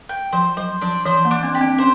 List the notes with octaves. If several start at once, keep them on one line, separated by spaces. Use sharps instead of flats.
G5
F3 C5
F#3 C5
F3 D4
E3 C5
A#3
D4
C4
G4
C4
C#4 C5